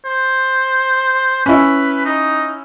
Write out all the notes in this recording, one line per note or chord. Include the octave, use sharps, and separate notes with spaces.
C5
C#4 E4 B4
D#4